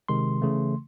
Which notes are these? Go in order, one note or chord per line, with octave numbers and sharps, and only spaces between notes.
C3 D#3 G#3 C6
C#3 E3 A3